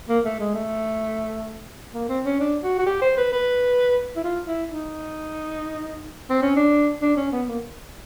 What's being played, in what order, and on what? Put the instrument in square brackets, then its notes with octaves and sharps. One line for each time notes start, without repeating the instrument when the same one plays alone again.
[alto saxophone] A#3
A3
G#3
A3
A#3
C4
C#4
D4
F#4
F#4
G4
C5
B4
B4
E4
F4
E4
D#4
C4
C#4
D4
D4
C#4
B3
A#3